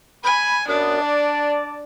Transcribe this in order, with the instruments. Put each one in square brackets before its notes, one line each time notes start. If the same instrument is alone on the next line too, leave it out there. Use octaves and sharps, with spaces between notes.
[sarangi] G#5 [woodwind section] B5
[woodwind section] F#2 B3 [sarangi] D4
[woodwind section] D5 A5